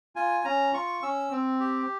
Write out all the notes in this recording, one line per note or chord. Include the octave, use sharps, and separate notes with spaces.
F4 G#5
C#4 A#5
F4 C#6
C#4 E6
C4
G4